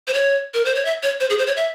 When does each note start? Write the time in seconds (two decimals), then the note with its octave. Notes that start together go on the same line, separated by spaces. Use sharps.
0.07 C5
0.14 C#5
0.54 A#4
0.65 C5
0.75 C#5
0.85 E5
1.03 C#5
1.20 C5
1.30 G#4
1.39 C5
1.47 C#5
1.57 E5